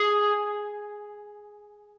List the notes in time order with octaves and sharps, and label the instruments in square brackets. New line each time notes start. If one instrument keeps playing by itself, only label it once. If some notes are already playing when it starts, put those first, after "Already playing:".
Already playing: [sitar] G#4